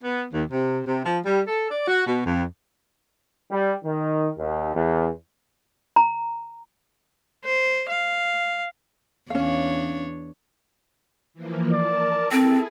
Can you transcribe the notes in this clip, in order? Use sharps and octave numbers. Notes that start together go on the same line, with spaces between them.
B3
D#2
C3
C3
F3
G3
A4
D5
F#4
B2
F2
G3
D#3
D#2
E2
A#5
C5
F5
E2 C#4 D4 C#5 F5
E3 F3 A#3
A#4 D5 A5
C4 E4 G#4 A4